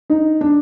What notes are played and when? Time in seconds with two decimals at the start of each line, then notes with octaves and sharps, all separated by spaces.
0.10 D#4
0.41 D4